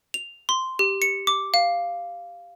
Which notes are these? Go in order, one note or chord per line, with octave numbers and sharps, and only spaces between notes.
F7
C6
G4
C#7
D6
F5